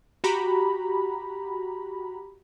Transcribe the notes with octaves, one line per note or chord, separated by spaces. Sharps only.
F#4 G4 A#5 B5